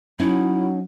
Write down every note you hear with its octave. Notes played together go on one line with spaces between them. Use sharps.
F#3 C#4 D#4 E4